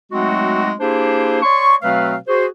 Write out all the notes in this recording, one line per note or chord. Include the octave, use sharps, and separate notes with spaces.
F#3 G#3 A3 C4 D#4 F#4
A#3 D4 E4 G4 G#4 C5
C#5 D5 C6 C#6
B2 F#3 A3 C4 B4 F5
F#4 G#4 C5